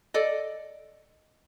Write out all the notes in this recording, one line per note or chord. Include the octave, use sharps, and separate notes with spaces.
A4 D5 D#5